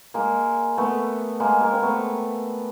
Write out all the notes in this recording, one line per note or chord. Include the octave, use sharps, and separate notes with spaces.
G#3 A#3
A3 B3
G#3 A#3
G#3 A#3
C4
A3 B3